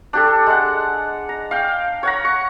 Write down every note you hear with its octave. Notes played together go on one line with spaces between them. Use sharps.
D4 G4 A4
G#3 F#5
A#5
F5 G5
C#5 F#5 A#5
C#6